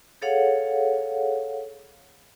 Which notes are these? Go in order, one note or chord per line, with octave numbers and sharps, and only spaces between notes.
G#4 A4 C#5 F5 F#5